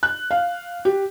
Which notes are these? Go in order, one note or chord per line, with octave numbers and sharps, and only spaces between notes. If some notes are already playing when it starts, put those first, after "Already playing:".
F#6
F5
G4